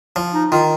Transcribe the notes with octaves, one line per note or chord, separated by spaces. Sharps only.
F3
D#4
D#3 F4